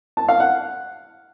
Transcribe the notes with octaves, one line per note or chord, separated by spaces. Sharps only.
A5
F5
F#5